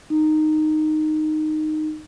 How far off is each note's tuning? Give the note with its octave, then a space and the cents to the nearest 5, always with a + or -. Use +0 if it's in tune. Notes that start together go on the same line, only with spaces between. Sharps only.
D#4 -10